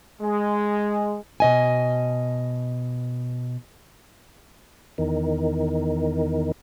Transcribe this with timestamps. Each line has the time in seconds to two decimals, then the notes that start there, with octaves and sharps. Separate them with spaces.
0.21 G#3
1.40 B2 D#5 G#5
4.98 E2 D#3